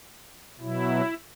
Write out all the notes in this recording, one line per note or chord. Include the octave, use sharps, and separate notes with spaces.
B2 F#3 E4